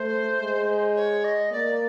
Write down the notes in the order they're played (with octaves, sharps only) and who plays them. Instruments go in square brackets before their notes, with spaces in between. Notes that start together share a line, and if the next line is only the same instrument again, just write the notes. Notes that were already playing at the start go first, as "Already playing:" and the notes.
Already playing: [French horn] A3 [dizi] C5
[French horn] G#3
[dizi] C#5
D#5
[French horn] A#3 [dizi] D5